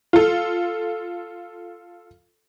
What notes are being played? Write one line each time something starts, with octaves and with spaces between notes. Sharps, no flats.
F4 A4